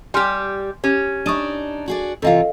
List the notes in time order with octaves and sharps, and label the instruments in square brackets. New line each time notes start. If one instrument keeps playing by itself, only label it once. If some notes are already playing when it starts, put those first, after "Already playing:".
[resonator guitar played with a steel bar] G3 G4 [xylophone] G#5 C6 F6
[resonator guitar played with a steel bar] C#4 [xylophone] G4
[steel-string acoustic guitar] D4 D#4 [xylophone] C#6 D#6 D#7
[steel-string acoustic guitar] F#4 G#4 D5
[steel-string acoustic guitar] C3 E3 F4 [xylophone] A4 D#5 F5